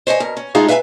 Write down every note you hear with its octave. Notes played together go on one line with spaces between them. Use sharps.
C5 C#5 D#5 G#5
B2 A#4
C#4
G#3 A3 D#4 F4 G#4 F5
B4 E5 F5 G5 G#5